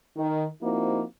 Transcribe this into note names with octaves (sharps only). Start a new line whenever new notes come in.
D#3
F3 A#3 C4 D#4 E4 F#4